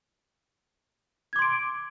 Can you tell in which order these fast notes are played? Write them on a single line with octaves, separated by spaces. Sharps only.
G#6 D6 C6 D7